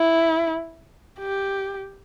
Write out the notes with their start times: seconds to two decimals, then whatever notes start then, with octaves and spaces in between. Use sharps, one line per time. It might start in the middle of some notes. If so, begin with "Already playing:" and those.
Already playing: E4
1.19 G4